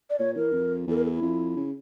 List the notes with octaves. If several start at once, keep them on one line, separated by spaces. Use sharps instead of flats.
D5
A#2 C#5
E3 A#4
F2
E2 A4
A#4
A4
E4
F2
C#3